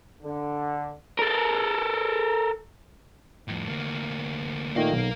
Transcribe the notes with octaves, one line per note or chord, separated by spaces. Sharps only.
D3
A4 A#4
F2 A2
D2 A#3
A#2 D#3 A3 A#4 F5
B1